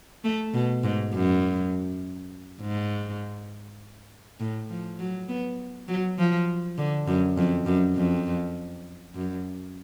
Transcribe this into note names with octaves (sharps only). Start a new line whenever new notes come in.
A3
B2
G#2
F#2
G#2
A2
F3
F#3
B3
F#3
F3
D3
F#2
F2
F#2
F2
F#2